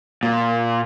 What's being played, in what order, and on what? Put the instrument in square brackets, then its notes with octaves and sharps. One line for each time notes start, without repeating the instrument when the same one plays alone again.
[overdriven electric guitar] A#2